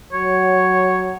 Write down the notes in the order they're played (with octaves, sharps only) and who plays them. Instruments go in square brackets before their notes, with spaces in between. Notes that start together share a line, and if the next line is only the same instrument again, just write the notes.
[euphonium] F#3 [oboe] C#5